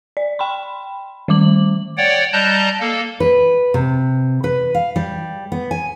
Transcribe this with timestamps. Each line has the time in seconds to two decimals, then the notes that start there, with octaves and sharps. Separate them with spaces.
0.17 D5
0.39 G5 B5 C6
1.28 D#3 G3 D6 F#7
1.97 C#5 D5 F#5 G5
2.33 G3 D#5 A5 A#5 F#6 G6
2.80 A#3 A4
3.20 B4
3.74 C3
4.44 B4
4.75 F5
4.96 G3
5.52 B3
5.71 G#5